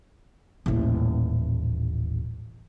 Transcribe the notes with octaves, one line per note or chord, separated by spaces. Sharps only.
D#1 A1